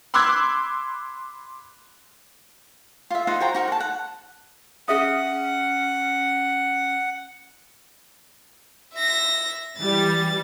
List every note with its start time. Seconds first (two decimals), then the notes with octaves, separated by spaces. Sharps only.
0.14 B5 C6 D6 E6 F#6 G#6
3.10 F4 E5
3.27 D#4 F4 C5 F#5
3.40 F#4 C5 G5 A#5
3.55 D#4 F#4 A#4
3.68 F#5 A5
3.80 F#5
4.88 C#4 G#4 E5 F#5 D#6
8.94 E5 A#6
9.78 E3 G3 A6